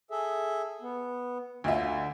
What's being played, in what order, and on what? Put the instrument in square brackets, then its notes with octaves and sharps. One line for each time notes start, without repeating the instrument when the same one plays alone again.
[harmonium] G#4 A4 E5
B3
[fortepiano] D2 F4 E5 [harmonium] D3